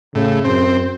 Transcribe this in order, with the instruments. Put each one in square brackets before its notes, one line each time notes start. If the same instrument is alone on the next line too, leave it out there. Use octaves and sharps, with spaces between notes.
[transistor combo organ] A2 [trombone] C#3
[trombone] F#2 [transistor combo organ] C4